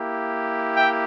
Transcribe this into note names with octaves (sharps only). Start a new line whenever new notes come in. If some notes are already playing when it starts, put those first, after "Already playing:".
Already playing: A#3 E4 G4
E5 G5